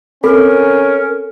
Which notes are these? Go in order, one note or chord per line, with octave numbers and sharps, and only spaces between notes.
C4 C#4 A4 A#4